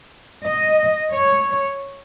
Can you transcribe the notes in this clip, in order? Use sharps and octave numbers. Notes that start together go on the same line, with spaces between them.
D#5
C#5